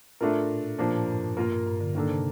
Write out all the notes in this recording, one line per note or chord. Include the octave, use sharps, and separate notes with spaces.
A2 A3 D4 F4 A#4
A#2
A#2 F3 A#3 D4
A2
G2
G2 A#3 F4 A#4
G2
G2
D3
D3 D#3 A#3 D4 A4
C3